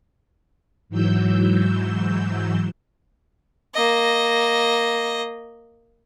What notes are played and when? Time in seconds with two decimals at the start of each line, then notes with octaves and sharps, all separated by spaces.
0.89 G#2 E3 F#3 E6 G6
3.74 A#3 D#5